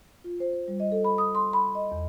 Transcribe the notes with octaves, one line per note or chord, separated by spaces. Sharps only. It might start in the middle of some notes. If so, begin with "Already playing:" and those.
F4
C5
C5
G3
D#5
A4
B5
D#6
C6
B5
D#5
E2